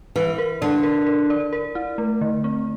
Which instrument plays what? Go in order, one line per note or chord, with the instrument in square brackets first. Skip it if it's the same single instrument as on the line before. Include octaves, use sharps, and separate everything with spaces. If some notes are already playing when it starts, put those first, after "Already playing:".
[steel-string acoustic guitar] E3 [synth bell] E4
[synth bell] A#4
[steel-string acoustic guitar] D3 [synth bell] D5
[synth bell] A#4
A#4
D5
A#4
E4
A3
D3
C4